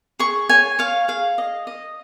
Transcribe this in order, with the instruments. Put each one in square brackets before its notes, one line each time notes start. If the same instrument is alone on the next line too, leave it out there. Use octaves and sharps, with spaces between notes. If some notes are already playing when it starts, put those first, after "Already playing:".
[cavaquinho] G#4 C#6
C#5 G#5
C#5 F5
G#4 F5
D#5
D#5